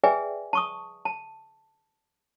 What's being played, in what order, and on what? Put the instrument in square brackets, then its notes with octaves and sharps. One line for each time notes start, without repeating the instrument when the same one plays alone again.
[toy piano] G#4 B4 D5 E5 G5 G#5
A5 C#6 D#6
A5